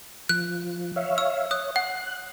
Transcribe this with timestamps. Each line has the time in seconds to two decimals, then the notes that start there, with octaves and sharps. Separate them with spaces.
0.29 F3 F#6
0.96 C#5 E5 F5
1.18 E6
1.51 C#5 D#6 F#6
1.76 F#5 F#6